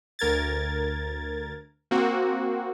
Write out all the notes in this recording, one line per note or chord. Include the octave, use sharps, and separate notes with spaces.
D2 A#4 G#6 A6
A#3 C4 F#4